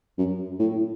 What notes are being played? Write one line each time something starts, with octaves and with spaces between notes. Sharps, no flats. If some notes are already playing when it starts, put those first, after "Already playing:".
F#2
A2